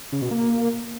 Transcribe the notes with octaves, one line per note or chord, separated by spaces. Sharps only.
C#3
B2
A#3